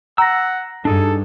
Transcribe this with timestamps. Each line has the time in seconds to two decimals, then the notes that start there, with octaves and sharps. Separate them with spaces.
0.18 F#5 A#5 E6 A#6
0.85 G2 D4 D#4 G#4 A4